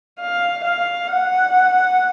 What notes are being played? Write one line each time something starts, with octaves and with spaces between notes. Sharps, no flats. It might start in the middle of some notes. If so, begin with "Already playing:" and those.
F5
F5
F#5